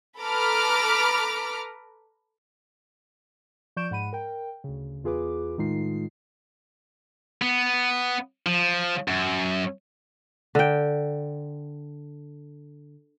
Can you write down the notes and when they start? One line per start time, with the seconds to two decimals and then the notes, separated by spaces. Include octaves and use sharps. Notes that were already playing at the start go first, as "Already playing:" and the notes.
0.19 A4 B4 A#5 B5 D6 F6
3.76 F3 D5 C#6 G6 D7 E7
3.91 G#2 F#5 B5 D#7
4.13 A#4 G5
4.64 D2 C#3
5.04 E2 F4 G#4 B4 D6
5.58 A2 D#3 G#3 D#4 F4 C7
7.42 B3
8.47 F3
9.08 F#2
10.55 D3 G5